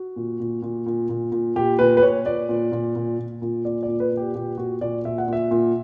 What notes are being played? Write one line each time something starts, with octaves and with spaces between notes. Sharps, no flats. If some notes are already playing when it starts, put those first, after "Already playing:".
Already playing: F#4
A#2
A#2
A#2
A#2
A#2
A#2
A#2 G4
A#2 B4
B4
A#2 C#5
A#2 D5
A#2
A#2
A#2
A#2
A#2
A#2 D5
D5
A#2
B4
A#2
G4
A#2 G4
A#2 F#4
A#2 D5
A#2 E5
F#5
A#2 E5
A#2